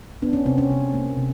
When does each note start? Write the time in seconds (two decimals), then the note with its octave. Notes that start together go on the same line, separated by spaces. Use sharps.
0.22 B3 D4
0.33 C#4
0.46 C3 C4
0.58 C#4
0.70 C3
0.94 A#3
1.17 C3